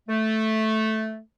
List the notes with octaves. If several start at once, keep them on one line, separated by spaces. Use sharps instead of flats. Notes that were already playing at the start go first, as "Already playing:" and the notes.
A3